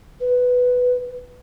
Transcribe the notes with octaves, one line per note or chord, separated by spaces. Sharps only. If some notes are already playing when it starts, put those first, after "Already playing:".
B4